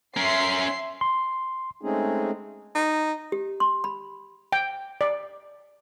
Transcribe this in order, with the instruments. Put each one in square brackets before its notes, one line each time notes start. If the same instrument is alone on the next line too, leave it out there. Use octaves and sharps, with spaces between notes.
[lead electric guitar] C#4 A#4 [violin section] E5 C6 C7
[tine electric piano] C6
[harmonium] G#3 A3 C4 C#4 D#4 G#4
[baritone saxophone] D#4
[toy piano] G4
C6
B5
[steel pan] G5
D5